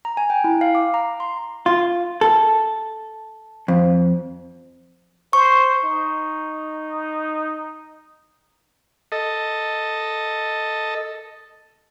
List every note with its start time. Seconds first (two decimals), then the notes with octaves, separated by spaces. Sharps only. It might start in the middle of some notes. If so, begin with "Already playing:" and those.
0.05 A#5
0.17 G#5
0.30 G5
0.44 E4
0.61 F5
0.75 D6
0.94 A#5
1.20 C6
1.66 F4
2.21 A4
3.68 F2
5.33 C5 C#6
5.84 D#4
9.12 A4 D#5